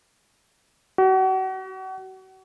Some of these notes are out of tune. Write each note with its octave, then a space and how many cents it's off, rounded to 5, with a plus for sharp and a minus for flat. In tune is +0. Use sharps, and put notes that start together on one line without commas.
F#4 +35